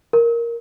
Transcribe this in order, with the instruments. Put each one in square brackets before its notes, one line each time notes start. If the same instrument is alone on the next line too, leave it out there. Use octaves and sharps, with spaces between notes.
[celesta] A#4